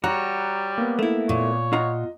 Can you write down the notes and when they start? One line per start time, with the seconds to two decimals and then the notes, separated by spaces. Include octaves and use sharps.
0.04 G3 F#4 C#5 A#5 F#6
0.78 A#3 B3
0.99 A3 E4
1.29 A#2 C#5
1.73 F4 D#5 F#5 A#5